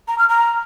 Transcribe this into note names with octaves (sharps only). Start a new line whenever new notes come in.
A#5
F6
A#5